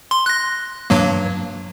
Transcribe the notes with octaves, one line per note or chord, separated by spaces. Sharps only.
C6
F#6 A#6
G2 F#3 A#3